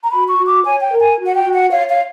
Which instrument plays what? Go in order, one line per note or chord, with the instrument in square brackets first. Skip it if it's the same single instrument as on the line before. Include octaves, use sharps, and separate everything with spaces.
[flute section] A#5
F#4 B5
C#6
F#4
D6
C#5 G#5
G5
A#4
G#5
F#4
F#5
G5
F#4
F#5
C#5 F5
F5